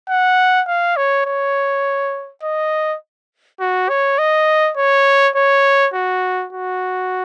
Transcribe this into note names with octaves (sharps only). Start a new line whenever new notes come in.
F#5
F5
C#5
C#5
D#5
F#4
C#5
D#5
C#5
C#5
F#4
F#4